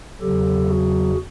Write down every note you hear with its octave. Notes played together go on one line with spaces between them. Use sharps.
E2 C#3 F#3 G4 A4
F#4 G#4